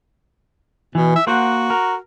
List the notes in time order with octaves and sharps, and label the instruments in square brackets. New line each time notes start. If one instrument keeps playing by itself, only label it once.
[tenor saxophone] B2 [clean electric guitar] E3
[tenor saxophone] E5
[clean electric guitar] A#3 C5 F#5 [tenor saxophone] F#4
[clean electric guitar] A#4